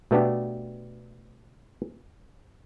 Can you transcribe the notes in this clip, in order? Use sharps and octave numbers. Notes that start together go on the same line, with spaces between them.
B2 A3 B3 D4 G4